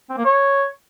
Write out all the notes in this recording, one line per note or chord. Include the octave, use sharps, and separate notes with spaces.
C4
A#3
C#5